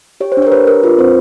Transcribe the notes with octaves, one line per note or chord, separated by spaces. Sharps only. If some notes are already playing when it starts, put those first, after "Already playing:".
G4 C#5
C5
D4
C#5
A#4
G4 B4
D4 A#4
F4 B4
C4 C5